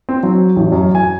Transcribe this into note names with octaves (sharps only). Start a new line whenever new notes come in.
C4
F#3
A1
F#2
G#5